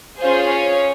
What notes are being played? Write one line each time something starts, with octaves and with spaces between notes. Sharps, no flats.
C#4 F4 G#4 C5
C#5